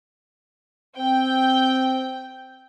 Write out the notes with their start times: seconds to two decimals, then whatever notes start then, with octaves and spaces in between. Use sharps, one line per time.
0.97 C4 G5